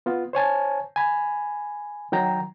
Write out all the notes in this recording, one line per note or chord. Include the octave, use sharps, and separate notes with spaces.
B3 F4
C5 C#5 G#5 A5
G#5 B5
D#3 F#3 G5 A#5